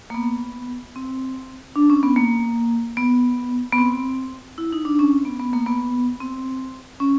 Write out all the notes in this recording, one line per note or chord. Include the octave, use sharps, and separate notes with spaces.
A#3
B3
C4
D4
C#4
B3
A#3
B3
B3
C4
E4
D#4
D4
C#4
C4
B3
B3
A#3
B3
C4
C#4